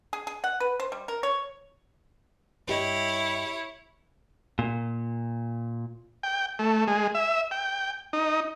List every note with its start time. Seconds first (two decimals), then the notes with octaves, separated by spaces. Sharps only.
0.13 G#4
0.27 G#4
0.44 F#5
0.60 B4
0.80 C5
0.92 G3
1.08 A#4
1.23 C#5
2.67 G2 E4 G4 C#5 D#5
4.59 A#2
6.23 G5
6.59 A3
6.87 G#3
7.15 E5
7.51 G5
8.13 D#4